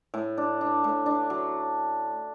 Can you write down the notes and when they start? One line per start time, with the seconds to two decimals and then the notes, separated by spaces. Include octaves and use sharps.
0.14 A2
0.37 D4
0.61 D4
0.84 A2
1.06 D4
1.30 F#3